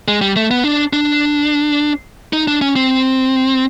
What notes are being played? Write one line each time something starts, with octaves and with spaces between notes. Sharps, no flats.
G#3
G3
A3
B3
D4
D4
D#4
D4
C#4
C4